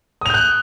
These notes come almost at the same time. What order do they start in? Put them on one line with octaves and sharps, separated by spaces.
D#6 F7 G6 F#6